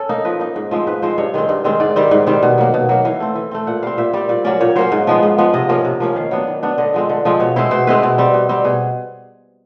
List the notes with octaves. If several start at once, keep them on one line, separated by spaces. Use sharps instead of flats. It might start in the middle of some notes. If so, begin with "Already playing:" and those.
Already playing: C#4 A4
A#3 D#4
F3 B4
A#3 D#4
G#2
F3 G#3 C4
G#2 B4
F3 G#3 C4 C5
G2 C#5
D#3 G#3 C4
G2
D#3 G#3 C4
G#2 D5
D#3 G3 C4
G#2
D#3 G3 C4
B2
F#3 A#3
B2
F#3 A#3
E3 F5
A3 C4
E3
A3 C4
A#2 F#5
G3 C4 F5
A#2 E5
G3 C4 D5
A#2 D5
F#3 A#3 C#4 D5
A#2 C#5
F#3 A#3 C#4 C5
G#2
F3 G#3 B3
G#2
F3 G#3 B3
C3 D#5
F3 A#3 C#4
C3
F3 A#3 C#4
D#3 F5
F#3 B3 D4
D#3
F#3 B3 D4
D3 D#5
F3 G#3 C4
D3
F3 G#3 C4
B2 C#5
G#3 C4 E4 C5
B2 C5
G#3 C4 E4 B4
B2
G3 C4
B2
G3 C4
B2 G#4